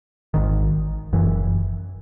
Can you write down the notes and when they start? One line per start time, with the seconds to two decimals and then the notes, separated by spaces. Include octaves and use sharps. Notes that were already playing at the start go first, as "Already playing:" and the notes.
0.34 G#1 G#2 D#3
1.13 F#1 F#2 E3